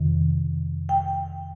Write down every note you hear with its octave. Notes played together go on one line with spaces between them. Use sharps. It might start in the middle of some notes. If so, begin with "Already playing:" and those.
Already playing: F2 C3 D#3
G5